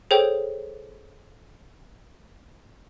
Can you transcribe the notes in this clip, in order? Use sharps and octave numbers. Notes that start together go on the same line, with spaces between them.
G#4 A4 C5 C#5 G5